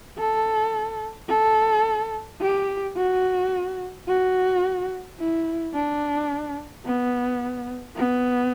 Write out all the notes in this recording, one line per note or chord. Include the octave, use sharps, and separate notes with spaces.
A4
A4
G4
F#4
F#4
E4
D4
B3
B3